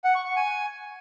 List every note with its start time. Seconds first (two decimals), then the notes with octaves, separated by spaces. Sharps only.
0.04 F#5
0.15 C#6
0.26 C#6
0.36 G#5